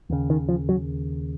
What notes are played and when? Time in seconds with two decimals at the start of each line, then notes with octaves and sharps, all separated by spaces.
0.10 D#2 C#3
0.30 D#3
0.49 F3
0.69 F#3